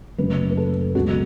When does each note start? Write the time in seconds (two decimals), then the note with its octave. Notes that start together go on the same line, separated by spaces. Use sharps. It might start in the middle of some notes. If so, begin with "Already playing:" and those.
0.18 F#1 F#2 F#3 A3 B4
0.50 B4
0.57 A4
0.95 C#2 B2 F#3 B3 F#4